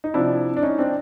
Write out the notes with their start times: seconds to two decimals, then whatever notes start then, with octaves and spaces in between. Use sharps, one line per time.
0.04 D#4
0.14 C3 F3 D4 E4
0.57 D4
0.63 C#4 D#4
0.79 C4 D4